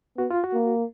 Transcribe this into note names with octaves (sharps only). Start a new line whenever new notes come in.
B3 F#4
F4
F#4
A#3